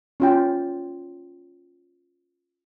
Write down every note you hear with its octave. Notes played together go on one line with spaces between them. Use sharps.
C#4 F4 G5